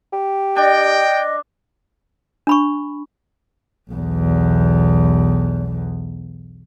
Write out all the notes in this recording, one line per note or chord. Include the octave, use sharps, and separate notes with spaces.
G4
D4 D#5 G5
D4 B5 C#6
B1 E2